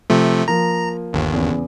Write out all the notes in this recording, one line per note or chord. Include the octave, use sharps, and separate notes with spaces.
C3 F3 A3
F3 A#3 A#5
G1 D#2
E2 C#3